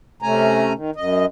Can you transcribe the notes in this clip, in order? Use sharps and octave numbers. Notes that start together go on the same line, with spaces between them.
C3 A3 C#4 G#5 A#5
D#3
F#2 D#5